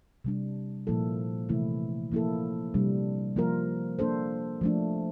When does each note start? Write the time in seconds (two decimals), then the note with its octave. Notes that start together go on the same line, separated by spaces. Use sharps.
0.25 C3 G3 D4
0.87 A#2 F3 A#3 E4 A4
1.49 C3 E3 A3 E4
2.12 F3 A#3 E4 A4
2.74 C3 G3 A#3 D4
3.36 F3 A#3 F4 A#4
3.99 A#3 D4 A4 C5
4.61 F3 A3 D4